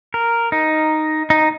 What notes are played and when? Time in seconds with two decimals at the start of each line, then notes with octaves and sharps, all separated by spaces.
0.14 A#4
0.52 D#4
1.30 D#4